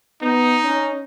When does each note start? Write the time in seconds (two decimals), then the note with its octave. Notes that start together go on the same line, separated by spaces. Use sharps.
0.22 B3 D#4
0.64 C#4